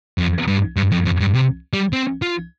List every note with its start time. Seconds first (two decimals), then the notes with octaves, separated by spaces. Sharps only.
0.18 F2
0.47 G2
0.76 G2
0.92 F2
1.05 F2
1.20 G2
1.34 C3
1.73 G3
1.93 C4
2.22 F4